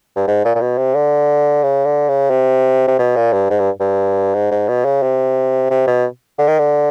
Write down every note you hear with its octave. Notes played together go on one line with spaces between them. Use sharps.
G2
G#2
A#2
A#2
B2
C3
D3
C#3
D3
C#3
C3
C3
B2
A#2
G2
G#2
G2
G2
G#2
G#2
B2
C#3
C3
C3
B2
D3
D#3
D3